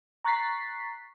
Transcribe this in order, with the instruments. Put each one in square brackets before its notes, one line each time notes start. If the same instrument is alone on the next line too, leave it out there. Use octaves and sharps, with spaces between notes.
[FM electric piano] A#5 C#6 F#6 A6 B6 C7